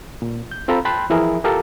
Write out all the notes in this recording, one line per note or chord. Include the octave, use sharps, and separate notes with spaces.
A#2
G6
C4 F4 A4 F5 A#5 B5
G5 A5 B5 C6 F#6 G6
E3 F3 E4 G#4 A#4
F4 G4 A4 A#4 F5 A5